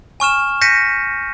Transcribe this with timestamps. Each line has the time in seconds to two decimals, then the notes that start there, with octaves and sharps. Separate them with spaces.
0.20 G#5 C#6 F6 E7
0.61 G6 A#6 B6 C#7 D#7